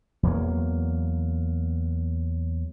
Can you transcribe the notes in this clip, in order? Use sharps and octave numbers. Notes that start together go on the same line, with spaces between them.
E2 F#3 A#3